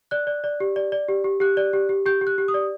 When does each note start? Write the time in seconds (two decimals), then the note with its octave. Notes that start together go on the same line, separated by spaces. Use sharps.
0.11 D5 F#6
0.27 D5
0.44 D5
0.60 G4
0.76 D5
0.92 D5
1.09 G4
1.24 G4
1.40 G4 F#6
1.57 D5
1.73 G4
1.89 G4
2.06 G4 G6
2.21 G4
2.27 F#6
2.38 G4
2.48 D#6
2.54 D5